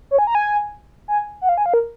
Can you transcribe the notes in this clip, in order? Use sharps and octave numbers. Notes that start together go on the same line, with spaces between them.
C#5
G#5
A#5
G#5
G#5
F#5
F5
G#5
F5
A#4